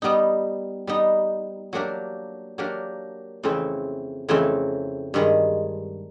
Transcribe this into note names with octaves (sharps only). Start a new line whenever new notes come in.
G3 B3 D#4
G3 B3 D#4
F#3 A#3 D4 G4 A#4
F#3 A#3 D4 G4 A#4
F2 C#3 E3 A3 C4
F2 C#3 E3 A3 C4
G2 D#3 G#3